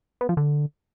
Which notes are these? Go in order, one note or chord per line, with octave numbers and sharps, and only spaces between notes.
B3
F3
D3